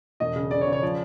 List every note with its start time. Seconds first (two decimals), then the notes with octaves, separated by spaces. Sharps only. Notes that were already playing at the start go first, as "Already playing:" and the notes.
0.20 E1 D#5
0.36 C#3
0.51 C#3 D5
0.61 C#5
0.67 C#3
0.72 C#5
0.83 F3 D5